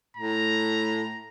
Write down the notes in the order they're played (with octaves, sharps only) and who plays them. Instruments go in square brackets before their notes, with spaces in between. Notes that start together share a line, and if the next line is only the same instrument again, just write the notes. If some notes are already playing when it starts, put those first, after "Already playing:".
[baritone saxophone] A2 [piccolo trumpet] A#5